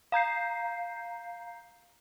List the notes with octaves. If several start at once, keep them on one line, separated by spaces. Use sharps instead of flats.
F5 A#5 G6 C7